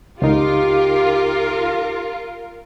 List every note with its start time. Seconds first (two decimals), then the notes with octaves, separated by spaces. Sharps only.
0.22 C#2 D#4 F4 G4 A#4